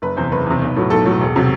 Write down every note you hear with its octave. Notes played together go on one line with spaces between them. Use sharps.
F#1 B4
E2 C3 C5
F#1 B4
E2 C3
B1
A2 F#3
B1 A4
A2 F#3
E1
C3 F#3